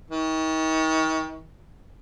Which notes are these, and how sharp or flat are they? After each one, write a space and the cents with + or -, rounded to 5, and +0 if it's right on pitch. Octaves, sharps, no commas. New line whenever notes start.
D#3 +40